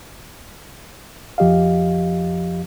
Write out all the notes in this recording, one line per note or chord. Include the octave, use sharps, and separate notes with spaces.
F2 F3 G4 D#5 F5